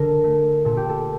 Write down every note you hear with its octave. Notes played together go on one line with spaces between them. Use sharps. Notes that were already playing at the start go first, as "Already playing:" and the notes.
Already playing: D3 A#4
A3
A#2 A4
G4
A4